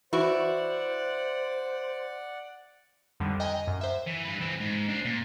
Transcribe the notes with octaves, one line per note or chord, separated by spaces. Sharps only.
E3 E4 F#4 C5 D5 F#5 C#6
F2 D3 D#3 G3
D#5 G5 G#5 A#5
F#2
C5 E5
E3
G2 B4
E3 C4
G#2
D4 C5
A#2